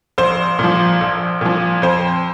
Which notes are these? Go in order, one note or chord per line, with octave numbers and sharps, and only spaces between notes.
A#1 C5
A#2 F3
A#1
A#2 F3
F2 C5